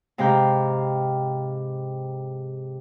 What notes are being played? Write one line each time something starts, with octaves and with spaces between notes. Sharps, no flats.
G#2 C3 F5 A#5 B5 G6